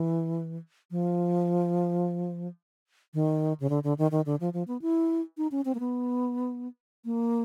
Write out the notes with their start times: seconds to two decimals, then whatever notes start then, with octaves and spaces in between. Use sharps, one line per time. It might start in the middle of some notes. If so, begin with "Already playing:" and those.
Already playing: E3
0.91 F3
3.14 D#3
3.60 C#3
3.70 D3
3.84 D3
3.98 D#3
4.11 D#3
4.26 D3
4.40 F3
4.54 F3
4.68 B3
4.82 E4
5.38 D#4
5.51 C#4
5.65 C4
5.75 A#3
5.80 B3
7.05 A#3